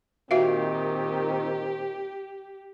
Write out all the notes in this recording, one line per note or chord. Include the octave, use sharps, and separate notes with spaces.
A#2 D#3 C4 F#4 G4 E5 F5